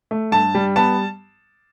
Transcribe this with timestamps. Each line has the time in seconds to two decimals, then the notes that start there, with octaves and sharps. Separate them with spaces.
0.11 A3
0.32 G2 A5
0.55 G3
0.76 B3 A5